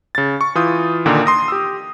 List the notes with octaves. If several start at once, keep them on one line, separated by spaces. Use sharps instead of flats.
C#3 A6
C#6
E3 F4 D#6 G6
A#2 D3 D#3 A#3
C6 D#6 A#6
G4 E6